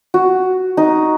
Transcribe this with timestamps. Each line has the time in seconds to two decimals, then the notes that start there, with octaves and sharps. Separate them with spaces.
0.14 F#4
0.77 D#4